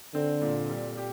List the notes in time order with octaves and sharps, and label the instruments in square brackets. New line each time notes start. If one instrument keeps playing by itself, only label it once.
[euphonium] D3 [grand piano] C4
[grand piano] A#2
G3
G4